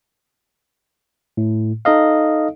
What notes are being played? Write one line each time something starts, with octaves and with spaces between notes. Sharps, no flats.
A2
D#4 A4 D#5 F5